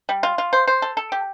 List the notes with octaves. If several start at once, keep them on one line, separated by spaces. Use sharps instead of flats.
G3
F4
F4
C5
C5
A4
A4
G4